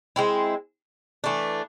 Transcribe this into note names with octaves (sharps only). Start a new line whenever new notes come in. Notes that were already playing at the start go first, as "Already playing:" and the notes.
G#3 C4 E4
E3 A3 D4